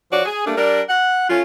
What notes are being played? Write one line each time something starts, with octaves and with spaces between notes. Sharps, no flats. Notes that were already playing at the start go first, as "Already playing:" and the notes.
F3 F#4 C#5 D5
G#4
G3 A3 A#3 D4
G3 D4 A#4
F#5
A3 C#4 F4